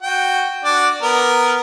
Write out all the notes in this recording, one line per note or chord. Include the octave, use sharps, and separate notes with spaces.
F#4 G5
D4 F#4 D5
B3 A#4